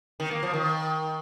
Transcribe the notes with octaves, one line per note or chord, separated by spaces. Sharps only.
D#3
A#3
F3
D#3